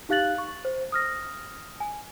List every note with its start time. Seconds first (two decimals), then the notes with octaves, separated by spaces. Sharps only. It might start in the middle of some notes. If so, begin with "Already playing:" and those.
0.09 D#4 G4 F5 F#6 A6 F#7
0.38 C#6
0.65 C5
0.92 D#6 F6 A#6
1.80 G#5